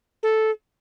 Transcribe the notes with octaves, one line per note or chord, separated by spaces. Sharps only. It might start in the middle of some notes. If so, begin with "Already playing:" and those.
A4